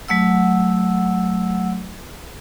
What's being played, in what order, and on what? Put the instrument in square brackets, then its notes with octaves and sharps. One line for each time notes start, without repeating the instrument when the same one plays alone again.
[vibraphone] F#3 A3 F#5 E6